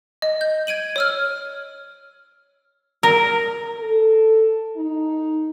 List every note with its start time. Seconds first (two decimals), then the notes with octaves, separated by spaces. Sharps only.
0.22 D#5
0.41 G6
0.67 G#6 D7 D#7 F#7
0.96 C#5 E6 F6
3.03 A#4
3.80 A4
4.77 D#4